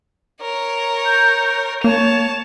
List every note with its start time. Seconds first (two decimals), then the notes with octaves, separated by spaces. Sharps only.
0.41 A#4 C#5
1.06 G6
1.84 A#3 C#5 A5 F7